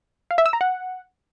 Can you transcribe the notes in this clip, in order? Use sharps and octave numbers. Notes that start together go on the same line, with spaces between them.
F5
E5
E6
A#5
F#5